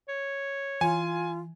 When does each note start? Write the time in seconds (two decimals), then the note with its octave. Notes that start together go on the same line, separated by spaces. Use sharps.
0.08 C#5
0.81 E3 F4 G#5